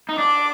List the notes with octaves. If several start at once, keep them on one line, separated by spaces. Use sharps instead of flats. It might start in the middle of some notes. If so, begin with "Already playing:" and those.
D#4
D4 D6